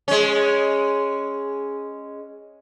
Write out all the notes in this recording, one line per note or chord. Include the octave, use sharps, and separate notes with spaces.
G#3 C#4